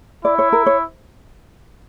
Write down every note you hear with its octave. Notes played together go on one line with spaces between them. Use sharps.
E4 D5
C#5
A#4
C#5